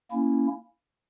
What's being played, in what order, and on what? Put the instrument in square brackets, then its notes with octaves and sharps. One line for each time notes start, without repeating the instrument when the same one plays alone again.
[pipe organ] A#3 C#4 E4